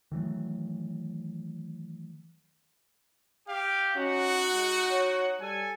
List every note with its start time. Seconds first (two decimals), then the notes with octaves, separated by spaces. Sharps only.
0.12 D#3 E3 F#3 A3
3.48 G4 F5
3.96 C#4 D#4 F#4 F#5
4.53 G#3
4.91 C#5
5.41 G3 A4 G#5